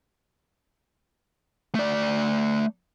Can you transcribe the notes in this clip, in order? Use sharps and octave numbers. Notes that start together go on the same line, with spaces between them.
A3 D5